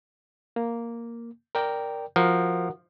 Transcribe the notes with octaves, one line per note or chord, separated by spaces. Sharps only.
A#3
A#4 D5 G5
F3 F#4 A#4 F#5